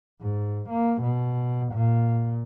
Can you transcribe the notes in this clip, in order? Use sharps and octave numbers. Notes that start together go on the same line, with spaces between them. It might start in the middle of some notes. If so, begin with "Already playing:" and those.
G#2
A#3
B2
A#2